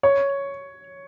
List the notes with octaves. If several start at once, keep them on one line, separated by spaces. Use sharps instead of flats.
C#5